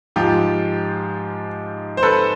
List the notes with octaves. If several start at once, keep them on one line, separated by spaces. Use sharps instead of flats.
G#2 F3 F4 G4
C5
A4 B4